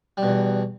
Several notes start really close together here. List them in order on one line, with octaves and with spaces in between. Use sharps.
G3 B2 E2